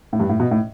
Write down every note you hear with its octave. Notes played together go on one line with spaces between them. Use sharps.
A2
G2
A2
B2
A2